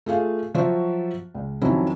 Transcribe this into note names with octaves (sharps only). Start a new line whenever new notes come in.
A3 F4 G#4 F5
F3 F#3 F4 F#4 C5 E5
C#2
F2 D#3 F3 F#3 C#4 E4